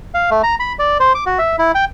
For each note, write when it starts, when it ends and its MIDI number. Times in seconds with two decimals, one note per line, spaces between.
0.14 0.30 77
0.31 0.42 57
0.43 0.55 82
0.60 0.73 83
0.79 0.98 74
1.00 1.13 72
1.15 1.24 86
1.26 1.39 66
1.39 1.56 76
1.59 1.72 64
1.75 1.85 79